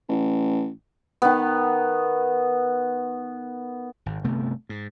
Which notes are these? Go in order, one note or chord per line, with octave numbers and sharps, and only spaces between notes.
A1
D#3 B3
G#1
G1 C3 A3 B3
G#2